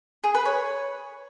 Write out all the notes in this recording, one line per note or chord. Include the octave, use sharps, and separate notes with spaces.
G#4
B4
C#5